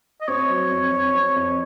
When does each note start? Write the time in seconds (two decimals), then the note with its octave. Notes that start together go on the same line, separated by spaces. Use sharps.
0.21 D#5
0.28 C4 C#5
0.49 F#3
0.71 F2
0.93 F2
1.15 C4
1.36 F2